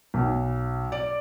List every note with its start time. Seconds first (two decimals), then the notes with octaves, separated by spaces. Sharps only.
0.14 B1
0.92 D5